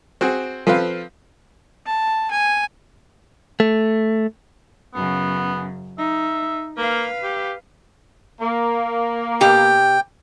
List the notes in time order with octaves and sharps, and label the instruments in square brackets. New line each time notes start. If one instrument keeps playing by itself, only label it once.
[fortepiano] C4 F#4 G#4
F3 C4 A4 B4 F5
[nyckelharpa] A5
G#5
[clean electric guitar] A3
[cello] F#2 C#3 [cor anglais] B3
[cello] D#4 [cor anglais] E5
[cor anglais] A#3 [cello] B4 F5
[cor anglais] G4
[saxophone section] A#3
[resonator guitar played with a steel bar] B2 G4 [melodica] G5